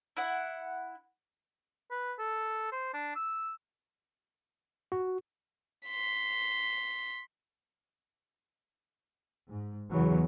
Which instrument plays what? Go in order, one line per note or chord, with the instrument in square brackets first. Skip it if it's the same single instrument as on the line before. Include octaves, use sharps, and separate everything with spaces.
[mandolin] E4 F#5
[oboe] B4
A4
C5
D4
E6
[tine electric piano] F#4
[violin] C6 B6
[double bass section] G#2
E2 C#3 E3 F#3